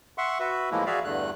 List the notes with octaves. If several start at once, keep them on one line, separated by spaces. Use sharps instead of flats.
E5 F#5 C6 C#6
F#4 B4 E5
A2 E3 F3 G#3 A#3 E4
F#4 G#4 D5 E5 F5
E2 G2 D3 A3 F#6